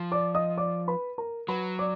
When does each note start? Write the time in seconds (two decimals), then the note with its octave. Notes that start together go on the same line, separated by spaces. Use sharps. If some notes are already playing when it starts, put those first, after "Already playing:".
Already playing: F3
0.12 D5 D6
0.35 D#5 D#6
0.58 D5 D6
0.88 B4 B5
1.18 A#4 A#5
1.48 F#3 B4 B5
1.79 D5 D6